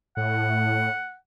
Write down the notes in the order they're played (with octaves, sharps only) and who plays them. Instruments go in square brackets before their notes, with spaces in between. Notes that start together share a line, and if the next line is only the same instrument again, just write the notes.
[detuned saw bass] A2 [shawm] F#5